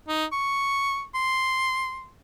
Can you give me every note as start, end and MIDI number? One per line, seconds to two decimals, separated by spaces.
0.08 0.26 63
0.32 1.04 85
1.14 2.10 84